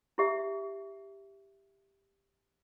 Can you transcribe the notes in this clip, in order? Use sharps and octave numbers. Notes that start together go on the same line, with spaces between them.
E4 G4 E5